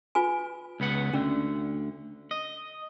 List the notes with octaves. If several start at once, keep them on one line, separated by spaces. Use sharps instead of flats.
F4 B4 G#5
C#2 B3 F#5
D2 D3 C#4
D#5